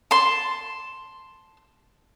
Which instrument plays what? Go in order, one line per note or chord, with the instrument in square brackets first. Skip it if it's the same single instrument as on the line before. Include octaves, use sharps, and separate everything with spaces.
[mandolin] A5 C6